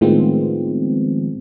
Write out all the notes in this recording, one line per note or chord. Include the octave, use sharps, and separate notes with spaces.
A2 D#3 F3 G#3 B3 C4